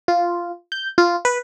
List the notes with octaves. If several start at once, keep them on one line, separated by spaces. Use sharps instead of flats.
F4
G6
F4
B4